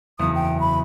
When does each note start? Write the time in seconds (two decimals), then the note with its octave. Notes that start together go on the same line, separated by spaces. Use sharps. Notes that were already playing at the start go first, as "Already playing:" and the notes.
0.19 F#1 E2 D#6
0.35 G5
0.60 B5